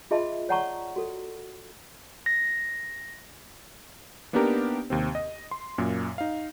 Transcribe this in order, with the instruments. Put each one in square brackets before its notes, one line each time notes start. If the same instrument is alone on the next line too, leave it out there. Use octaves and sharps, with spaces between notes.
[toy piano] F4 G#4 D#5 E5 A5 C6
C#5 D5 F#5 A5 A#5 C#6
F#4 A4
[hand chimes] A#6
[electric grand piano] A#3 B3 D4 D#4 G4 A#4
D#2 C3 C4
D#5
C6
F#2 A#2
D#4 F5